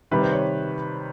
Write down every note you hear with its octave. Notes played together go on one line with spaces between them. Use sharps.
C3 D#3 G3 B4
C5
C#5